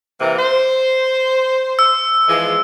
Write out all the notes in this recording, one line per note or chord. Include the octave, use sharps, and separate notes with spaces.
C3 E3 A#3
C5
E6
E3 F3 G#3